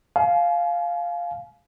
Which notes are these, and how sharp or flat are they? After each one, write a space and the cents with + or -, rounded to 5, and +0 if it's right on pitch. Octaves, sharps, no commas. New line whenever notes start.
F5 +0 G#5 +40